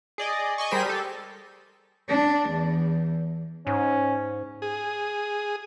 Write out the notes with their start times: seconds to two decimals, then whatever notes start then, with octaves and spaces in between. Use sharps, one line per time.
0.18 G#4 D5 D#5
0.58 D#5 G#5 C#6
0.71 G3 G#4 A#4 C5 B6 D#7
0.86 G4 A4
2.08 D4
2.50 E2
3.67 G#2 C#4
4.62 G#4